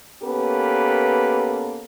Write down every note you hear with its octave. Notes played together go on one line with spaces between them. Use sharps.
A#3 B3 C#4 G4 A4 B4